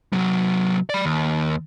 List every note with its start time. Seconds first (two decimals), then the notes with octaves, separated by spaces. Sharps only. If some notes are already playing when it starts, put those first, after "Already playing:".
0.13 C3 F#3
0.89 D5 B5
1.05 D#2